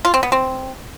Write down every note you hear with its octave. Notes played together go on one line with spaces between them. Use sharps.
F4
C4
B3
C4